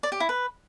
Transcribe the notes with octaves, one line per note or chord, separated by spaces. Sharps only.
D5
G4
E4
B4